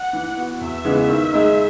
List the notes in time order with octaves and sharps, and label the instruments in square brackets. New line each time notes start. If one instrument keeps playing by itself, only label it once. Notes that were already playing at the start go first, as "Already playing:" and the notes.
Already playing: [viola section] F#5
[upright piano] E3
B3 F#4
[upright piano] E2 [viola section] E5
[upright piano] C#3 E3 G#3 B3
D#3
G#3 D#4